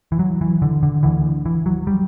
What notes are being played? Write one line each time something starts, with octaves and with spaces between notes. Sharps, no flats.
E3
F#3
E3
D3
D3
D2 D3 E3
E3
F#3
G3